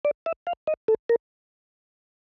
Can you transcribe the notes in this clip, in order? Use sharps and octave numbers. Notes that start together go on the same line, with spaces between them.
D5
E5
F5
D#5
A4
A#4